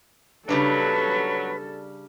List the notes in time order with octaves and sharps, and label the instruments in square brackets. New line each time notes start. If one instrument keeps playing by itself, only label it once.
[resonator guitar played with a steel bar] C#3 G3 D4 [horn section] F#3 [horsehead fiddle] A4 [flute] B4